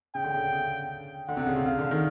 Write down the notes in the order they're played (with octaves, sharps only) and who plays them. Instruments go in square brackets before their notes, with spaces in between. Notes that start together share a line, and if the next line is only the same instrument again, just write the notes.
[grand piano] C#3 [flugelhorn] G5
[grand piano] D3
C#3
C#3
[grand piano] D3 [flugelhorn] F#5
[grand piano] C3
C#3
C3
[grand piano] C#3 [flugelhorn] F5
[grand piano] D3
D#3